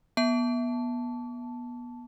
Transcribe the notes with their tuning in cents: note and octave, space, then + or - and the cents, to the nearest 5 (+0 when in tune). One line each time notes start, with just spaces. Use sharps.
B3 -25 A5 +0